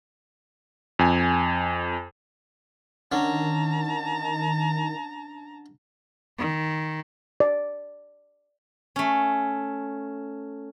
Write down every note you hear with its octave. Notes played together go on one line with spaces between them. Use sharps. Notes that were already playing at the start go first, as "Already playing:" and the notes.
F2 G#5
D3 D#3 C#4 A5 A#5
D#3
D5
A3 C#4